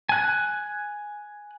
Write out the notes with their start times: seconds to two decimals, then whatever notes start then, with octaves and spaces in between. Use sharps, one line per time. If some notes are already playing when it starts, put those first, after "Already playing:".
0.09 G#5 F#6